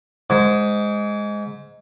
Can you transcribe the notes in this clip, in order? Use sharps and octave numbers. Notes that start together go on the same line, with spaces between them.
G#2